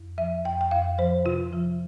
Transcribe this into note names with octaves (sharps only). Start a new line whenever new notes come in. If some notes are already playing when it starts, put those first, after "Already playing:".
Already playing: F2
F3 E5
F2 G5
G5
F2 F5
F3 C5
C3 F4
F3